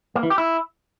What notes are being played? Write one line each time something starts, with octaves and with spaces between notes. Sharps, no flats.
A#3
E3
G4
E4